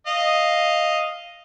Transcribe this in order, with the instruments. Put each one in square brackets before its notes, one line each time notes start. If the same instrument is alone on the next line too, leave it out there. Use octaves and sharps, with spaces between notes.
[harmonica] D#5 F5